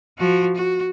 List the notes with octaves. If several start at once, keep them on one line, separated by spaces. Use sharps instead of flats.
F3 F#4
F#4